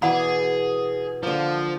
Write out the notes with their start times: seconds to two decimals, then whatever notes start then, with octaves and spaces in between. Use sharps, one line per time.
0.02 B2 E3 G#4 D5 F#5 B5 D6
1.23 D3 F3 A#3